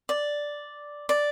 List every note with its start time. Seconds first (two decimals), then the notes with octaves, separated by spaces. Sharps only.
0.09 D5
1.09 D5